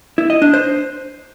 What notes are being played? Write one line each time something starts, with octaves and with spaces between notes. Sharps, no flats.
E4
D#5
D4
C5